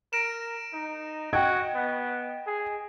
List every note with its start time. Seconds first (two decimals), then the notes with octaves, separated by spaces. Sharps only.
0.13 A#4 A#6 D7 E7
0.73 D#4
1.33 F#4 D#5 G5 G#6
1.75 B3
2.47 G#4